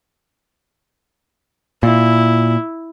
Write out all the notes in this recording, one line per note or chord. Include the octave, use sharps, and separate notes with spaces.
A#2 E4